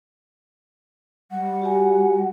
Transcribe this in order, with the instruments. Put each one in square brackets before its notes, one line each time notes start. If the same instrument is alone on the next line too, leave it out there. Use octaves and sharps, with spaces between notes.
[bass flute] G3 [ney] F#5
[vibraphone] F#4 G4 G#5